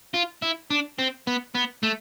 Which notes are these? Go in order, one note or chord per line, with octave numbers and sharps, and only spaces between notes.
F4
E4
D4
C4
B3
B3
A3